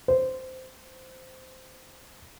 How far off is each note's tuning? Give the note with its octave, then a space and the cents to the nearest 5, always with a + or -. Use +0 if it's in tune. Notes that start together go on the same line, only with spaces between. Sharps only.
C5 -15